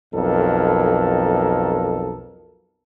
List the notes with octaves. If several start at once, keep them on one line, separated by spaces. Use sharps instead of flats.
B1 F2 A4 A#4